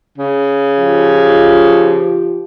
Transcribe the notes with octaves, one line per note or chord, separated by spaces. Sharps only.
C#3
F3 F4 G4